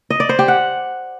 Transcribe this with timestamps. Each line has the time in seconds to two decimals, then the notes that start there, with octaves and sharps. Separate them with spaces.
0.10 D#5
0.20 D5
0.29 C5
0.39 G4
0.48 F#5